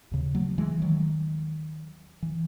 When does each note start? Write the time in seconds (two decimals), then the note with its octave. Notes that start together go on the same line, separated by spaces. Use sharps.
0.11 D#2 C#3
0.35 F#3 A3
0.58 E3 G#3
0.82 D#3 F#3
2.22 E3